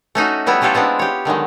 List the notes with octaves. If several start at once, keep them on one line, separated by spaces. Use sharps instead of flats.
A3 C#4 D#4 F#4
F#3 G3 B3 E4 C#5
A3 C#4 E4 F4 G4 A4
G#3 B3 C4 D4
G4 C#5
D3 D#3 F#3 G#3